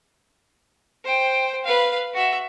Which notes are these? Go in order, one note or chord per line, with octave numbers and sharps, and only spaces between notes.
C5 G5
B4 F5
F#4 E5